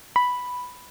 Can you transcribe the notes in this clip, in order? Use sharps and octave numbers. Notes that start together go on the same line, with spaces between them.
B5